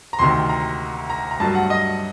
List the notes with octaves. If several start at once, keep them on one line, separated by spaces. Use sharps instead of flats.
A#5
D2 C3 D#3 C6
A#5
A#5
A#5
G2 F#3 A3 A5
F#5
D#5